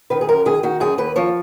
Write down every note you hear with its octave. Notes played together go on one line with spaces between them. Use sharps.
D#3 B4
G#4
F#2 A#4
D#3 G#4
D#3 F#4
F#2 G#4
D#2 B4
F3 C#5